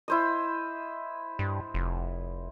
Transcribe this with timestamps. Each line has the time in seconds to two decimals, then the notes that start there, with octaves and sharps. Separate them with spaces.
0.08 E4 C5 D#5
1.39 G2
1.74 F1